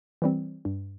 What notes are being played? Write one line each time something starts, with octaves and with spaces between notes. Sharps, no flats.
E3 G3 C4
G2